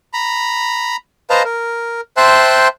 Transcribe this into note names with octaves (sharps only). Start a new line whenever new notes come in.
A#5 B5
B4 C5 D#5 F5 A5 A#5
A#4
C5 E5 G5 A5 C6 F#6